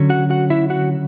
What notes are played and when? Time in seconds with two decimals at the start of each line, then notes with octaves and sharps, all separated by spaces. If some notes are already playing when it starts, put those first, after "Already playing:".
Already playing: D3 F#3 C#4
0.09 F#4 F#5
0.30 F#4 F#5
0.50 E4 E5
0.70 F#4 F#5